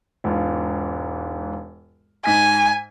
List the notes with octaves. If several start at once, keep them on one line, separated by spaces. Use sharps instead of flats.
E1 G#2 F4
G#2 D#4 G#5 B6